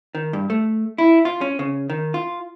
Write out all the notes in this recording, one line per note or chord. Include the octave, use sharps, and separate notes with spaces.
D#3
G2
A3
E4
F4
C#4
C#3
D#3
F4